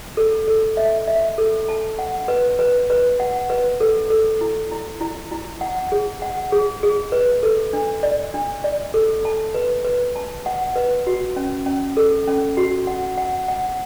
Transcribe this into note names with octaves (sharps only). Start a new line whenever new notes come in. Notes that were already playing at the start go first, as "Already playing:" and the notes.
A4
A4
E5
E5
A4
A5
F#5
B4
B4
B4
F#5
B4
A4
A4
E4
E4
E4
E4
F#5
G#4
F#5
G#4
G#4
B4
A4
D4
D5
D4
D5
A4
A5
B4
B4
A5
F#5
B4
F#4
C#4
C#4
A4
C#4
F#4
F#5
F#5
F#5